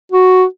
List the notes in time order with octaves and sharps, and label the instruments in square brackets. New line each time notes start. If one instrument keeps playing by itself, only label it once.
[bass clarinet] F#4